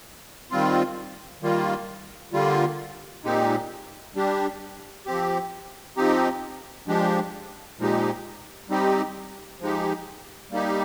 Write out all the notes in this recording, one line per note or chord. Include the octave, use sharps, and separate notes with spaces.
D#3 G3 C4 F4
D#3 G3 A#3 F4
D3 G3 A#3 F4
A#2 G#3 C4 D#4 G4
G3 D4 G4
F3 C4 G4
F3 C4 D#4 G4
F3 G#3 D4 G4
A#2 F3 G#3 D#4 G4
G3 C4 D#4 G4
F3 G#3 D#4 G4
G3 A#3 D#4 G4